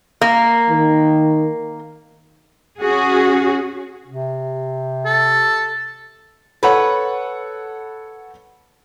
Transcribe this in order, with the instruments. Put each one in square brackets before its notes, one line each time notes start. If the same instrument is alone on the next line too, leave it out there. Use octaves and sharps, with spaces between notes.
[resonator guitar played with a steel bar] A#3
[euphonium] D#3
[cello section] C#4 F#4 G#4
[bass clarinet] C3
[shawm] A4
[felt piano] A4 C#5 F#5 [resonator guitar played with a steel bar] B4